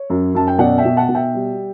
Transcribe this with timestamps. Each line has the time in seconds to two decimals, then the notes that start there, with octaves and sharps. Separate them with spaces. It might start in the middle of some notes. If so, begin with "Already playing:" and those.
Already playing: C#5
0.10 F#2
0.34 F#2 A5
0.48 G5
0.59 B2 D5 F#5
0.78 E5 G5
0.85 B2
0.97 F#5 A5
1.09 B2
1.15 E5 G5
1.34 G3